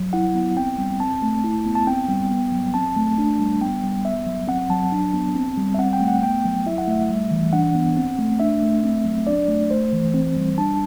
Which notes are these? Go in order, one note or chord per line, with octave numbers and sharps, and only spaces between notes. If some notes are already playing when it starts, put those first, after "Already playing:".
Already playing: F#3
E4 F#5
B3
C4 G5
G3
C4 A5
A3
E4
B3
A5
C4 G5
G3
B3
F#3
C4 A5
A3
D4
G3
B3 G5
G3
B3 E5
F#3
C4 F#5
F#3 A5
D4
B3
C4
G3
E5
C4 F#5
G5
A3
F#5
B3 G5
F#3
E4 E5
F#5
A3 E5
G3
E3
D4 F#5
B3
C4
A3
D4 E5
A3
C4
F#3
D4 D5
A3
A3 C5
E3
C4
G3
D4 A5